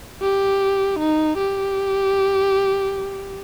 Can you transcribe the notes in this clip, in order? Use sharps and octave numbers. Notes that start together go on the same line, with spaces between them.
G4
D#4
G4